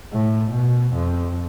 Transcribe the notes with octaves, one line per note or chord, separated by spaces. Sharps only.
A2
B2
F2